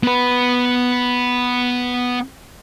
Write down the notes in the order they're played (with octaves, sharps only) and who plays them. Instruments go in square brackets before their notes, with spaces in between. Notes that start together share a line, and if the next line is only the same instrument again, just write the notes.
[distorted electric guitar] B3 B4